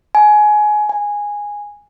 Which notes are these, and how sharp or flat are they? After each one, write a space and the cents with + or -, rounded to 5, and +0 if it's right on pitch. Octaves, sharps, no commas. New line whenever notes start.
G#5 +20
G#5 -10